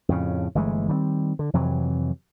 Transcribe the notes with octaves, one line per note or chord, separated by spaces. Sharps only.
F2 A2 C#3
G1 E3 G#3 A3
D#3 G3 A3 C4
D3
F2 C3 E3 F#3